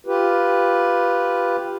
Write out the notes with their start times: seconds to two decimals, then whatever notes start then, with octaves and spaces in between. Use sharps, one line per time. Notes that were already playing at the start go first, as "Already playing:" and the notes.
0.06 F4 G4 B4